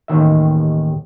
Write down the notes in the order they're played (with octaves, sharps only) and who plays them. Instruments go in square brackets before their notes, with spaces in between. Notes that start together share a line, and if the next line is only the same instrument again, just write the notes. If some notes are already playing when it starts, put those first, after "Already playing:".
[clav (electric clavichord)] A1 D#2 D#3 E5